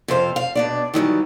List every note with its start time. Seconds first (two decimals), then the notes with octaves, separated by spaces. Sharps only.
0.08 F2 C3 C5 F5
0.36 F5
0.55 B2 D4 D5
0.94 D#3 E3 F#3 G3